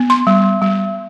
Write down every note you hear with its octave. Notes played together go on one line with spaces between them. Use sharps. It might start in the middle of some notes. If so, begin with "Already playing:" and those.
Already playing: B3
C6
G3
G3